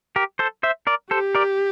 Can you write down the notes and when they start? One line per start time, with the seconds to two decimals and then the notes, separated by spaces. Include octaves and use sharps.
0.16 G4 A#4
0.39 A4 C5
0.63 C5 E5
0.87 A#4 D5
1.11 G4 A4 C5
1.35 A#4 D5